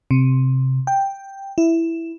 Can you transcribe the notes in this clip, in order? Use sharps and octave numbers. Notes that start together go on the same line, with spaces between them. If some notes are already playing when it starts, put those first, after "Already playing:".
C3
G5
E4